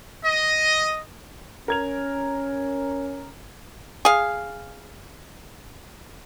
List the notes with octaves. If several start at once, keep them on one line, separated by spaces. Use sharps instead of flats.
D#5
C#4 A#4 G#6 F7
G#4 F5